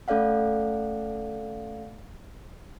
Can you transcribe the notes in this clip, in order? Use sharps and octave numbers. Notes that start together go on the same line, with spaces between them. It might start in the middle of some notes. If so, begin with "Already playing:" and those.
A3 C#4 A4 D5 F5 F#5